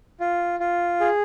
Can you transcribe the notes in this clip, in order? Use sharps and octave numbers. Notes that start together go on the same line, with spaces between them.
F4
F4
G#4